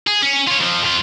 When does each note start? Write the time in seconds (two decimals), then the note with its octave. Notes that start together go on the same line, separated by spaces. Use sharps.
0.07 G#4
0.22 C#4
0.48 F4 C#5
0.60 F2 F3
0.83 F2 F4